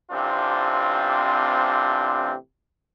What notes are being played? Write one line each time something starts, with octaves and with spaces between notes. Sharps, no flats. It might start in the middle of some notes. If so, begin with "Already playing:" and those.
A1 C3 C4 D4 F4